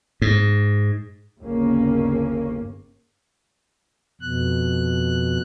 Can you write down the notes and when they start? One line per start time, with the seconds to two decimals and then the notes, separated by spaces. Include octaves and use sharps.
0.22 G#2
1.40 G1 D#2 C#3 A#3 C#4
4.21 F2 B2 F#6